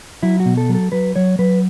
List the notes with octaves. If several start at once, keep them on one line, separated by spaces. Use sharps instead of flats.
F#3 E4
F#4
B2
A4
F#3
A4
F#3 B4
F#3 C#5
F#3 B4